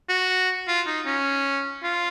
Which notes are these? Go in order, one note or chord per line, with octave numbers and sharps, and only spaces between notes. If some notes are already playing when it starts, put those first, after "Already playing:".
F#4
F4
D#4
C#4
F4